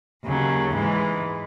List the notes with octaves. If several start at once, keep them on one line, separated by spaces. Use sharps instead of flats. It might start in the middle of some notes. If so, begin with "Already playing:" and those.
D#2 C#3 F#3
G#2 E3 G#3